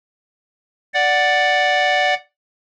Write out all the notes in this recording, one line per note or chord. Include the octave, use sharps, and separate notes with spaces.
D5 F#5